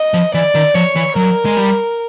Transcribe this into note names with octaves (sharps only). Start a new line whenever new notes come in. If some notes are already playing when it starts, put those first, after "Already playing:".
Already playing: D#5
F3
E3 D5
D#3
F3 C#5
E3
F#3 A#4
G#3
G3